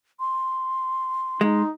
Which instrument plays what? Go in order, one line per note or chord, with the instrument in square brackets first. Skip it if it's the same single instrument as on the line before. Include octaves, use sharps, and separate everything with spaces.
[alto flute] C6
[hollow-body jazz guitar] G#3 [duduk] D#4